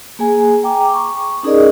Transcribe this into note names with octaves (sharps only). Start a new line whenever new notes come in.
A#3 G#4 G#5
G5 A#5 D6
C#6
C#4 D#4 G#4 A#4 D5 D#5